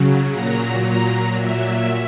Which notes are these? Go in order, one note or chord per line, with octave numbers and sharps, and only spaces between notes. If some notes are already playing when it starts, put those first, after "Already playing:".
Already playing: C#3 F#3
A#2 F#3 A#5
A#2 F#3 A#5
A#2 F#3 E5